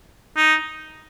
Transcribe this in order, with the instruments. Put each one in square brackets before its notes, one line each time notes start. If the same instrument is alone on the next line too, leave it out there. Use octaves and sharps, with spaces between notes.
[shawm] D#4